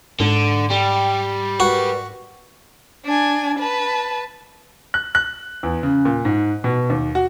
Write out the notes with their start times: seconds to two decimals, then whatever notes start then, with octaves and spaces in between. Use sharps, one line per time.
0.20 G#2 D3
0.71 G3 G5
1.60 F#4 A#4 B4
3.05 D4 G#5
3.59 B4 A5
4.94 F#6
5.15 F#6
5.63 E2
5.83 C#3
6.05 A#2
6.25 G#2
6.64 B2
6.90 D#2
7.15 F#4